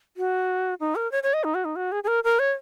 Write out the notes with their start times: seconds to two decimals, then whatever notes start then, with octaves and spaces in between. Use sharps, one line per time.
0.17 F#4
0.80 D#4
0.96 A#4
1.12 C#5
1.23 C#5
1.34 D#5
1.44 D#4
1.55 F#4
1.65 D#4
1.76 F#4
1.92 G#4
2.04 G#4
2.08 A#4
2.24 A#4
2.39 C#5